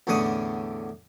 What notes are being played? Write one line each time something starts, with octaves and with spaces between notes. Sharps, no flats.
E2 A2 D3 C#4 F#5 D#6